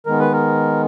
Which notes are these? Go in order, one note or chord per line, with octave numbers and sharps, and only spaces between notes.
D#3 G#3 B3 A#4
B4
A#4